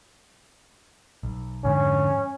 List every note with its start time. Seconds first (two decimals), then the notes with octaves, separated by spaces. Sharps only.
1.23 B1
1.65 F2 G#2 D3 C#4